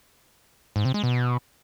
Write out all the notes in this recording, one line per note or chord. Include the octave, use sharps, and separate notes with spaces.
G#2
C3
G#3
B2